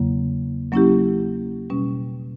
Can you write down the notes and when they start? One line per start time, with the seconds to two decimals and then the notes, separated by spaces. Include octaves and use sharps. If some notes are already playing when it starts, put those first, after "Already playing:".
Already playing: E2 C#3 F#3 A#3
0.72 F#3 A#3 C#4 E4 G4
1.70 B2 G3 C#4